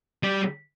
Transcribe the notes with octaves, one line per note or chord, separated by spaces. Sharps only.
G3